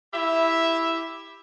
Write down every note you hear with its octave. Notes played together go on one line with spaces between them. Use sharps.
E4 G4 E5